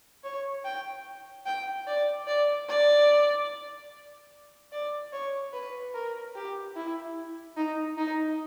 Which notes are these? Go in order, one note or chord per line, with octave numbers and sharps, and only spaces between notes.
C#5
G5
G5
D5
D5
D5
D5
C#5
B4
A#4
G4
E4
D#4
D#4